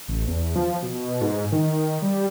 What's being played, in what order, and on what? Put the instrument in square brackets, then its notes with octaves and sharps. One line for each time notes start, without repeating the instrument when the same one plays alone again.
[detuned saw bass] A1
E2
F3
B2
G#2
D#3
G3